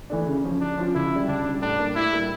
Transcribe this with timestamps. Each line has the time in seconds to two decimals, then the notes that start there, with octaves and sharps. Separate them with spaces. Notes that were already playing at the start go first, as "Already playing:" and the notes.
0.10 E3 A3 D4
0.26 C#3
0.44 F3 C#4 F4
0.61 C#3 D4
0.78 F3 C#4 F4
0.94 C#2 E4
1.11 C#3
1.16 G3
1.28 C#2 D4
1.45 C#3 G3
1.62 A2 D4
1.78 G3 A#3
1.95 A2 E4
2.13 G3 A#3